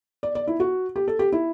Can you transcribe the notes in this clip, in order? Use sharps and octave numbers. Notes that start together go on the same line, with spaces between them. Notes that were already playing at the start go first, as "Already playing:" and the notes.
D5
D5
E4
F#4
G4
A4
G4
E4